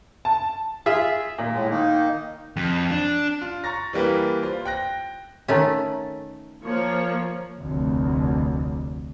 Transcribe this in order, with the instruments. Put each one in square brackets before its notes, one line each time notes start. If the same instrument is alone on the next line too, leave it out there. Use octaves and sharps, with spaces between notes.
[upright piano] A5
[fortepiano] F4 G#4 E5
A#2
[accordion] A2 G#3
D#3 A#3 D#4
[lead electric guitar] F2
D4
[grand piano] F4
A#5 C#6 A6 A#6
E3 G3 A#3 G4 B4
F4 C5
G5 F#6 A#6
[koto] D#3 A3 C#4
[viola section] F3 A#3 C#5
[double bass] F1 D2